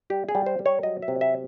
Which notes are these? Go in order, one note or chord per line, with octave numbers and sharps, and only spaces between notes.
G3 G4
G#4
G3
C5
G3
C#5
F#3 D#5
E5
C3
E5